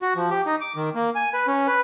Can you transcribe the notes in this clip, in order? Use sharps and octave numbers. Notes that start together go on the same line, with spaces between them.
F#4
F3
G4
D#4
D6
D#3
A#3
G#5
B4
C#4
B4